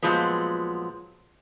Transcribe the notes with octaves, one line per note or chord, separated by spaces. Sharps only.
A#2 F3 F#3 G#3 B3